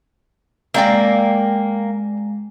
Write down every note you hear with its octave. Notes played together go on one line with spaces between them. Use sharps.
G#3 A#3 C4 D5 G5